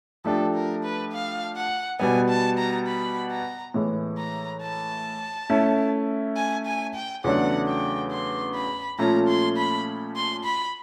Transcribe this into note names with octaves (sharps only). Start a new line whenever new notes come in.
F3 A3 D4 G4 A4
A#4
B4
F5
F#5
B2 G3 B3 G#5
A5
A#5
B5
A#5
A2 E3 G#3
A#5
A5
A3 C#4 E4
G#5
G#5
G5
E2 C#3 F#3 A3 D4 F#5
G5
C6
B5
A#2 F3 A3 C#4 F4 A#5
C6
B5
C6
B5